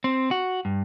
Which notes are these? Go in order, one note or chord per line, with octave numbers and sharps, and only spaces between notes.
C4
F#4
G2